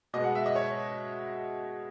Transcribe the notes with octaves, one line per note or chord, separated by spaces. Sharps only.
B2 G#3 B3 D#5
F#5
E5
D#5
C#5